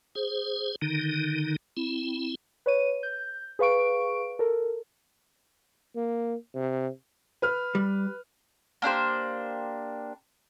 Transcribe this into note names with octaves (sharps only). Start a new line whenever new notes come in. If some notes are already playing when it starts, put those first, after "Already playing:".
G#4 C5
D3 D#3 D#4
C4 E4
B4 C#5 D#7
G6
G#4 B4 F5 C#6 D7
A4 A#4
A#3
C3
B4 F6
G3
A#3 D4 G4 C5